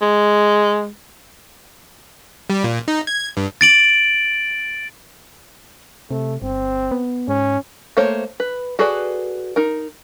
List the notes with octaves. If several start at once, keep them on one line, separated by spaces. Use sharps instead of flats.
G#3
G3
A#2
D#4
G#6
G2
A6 D7 F#7
C3 A3
G1 C4
B3
G#2 C#4
A3 A#3 C5 C#5
B4
F#4 G#4 A4 B4 D5
D#4 A#4